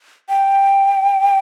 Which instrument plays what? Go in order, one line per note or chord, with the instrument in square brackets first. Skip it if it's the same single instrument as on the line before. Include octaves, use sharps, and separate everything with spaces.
[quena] G5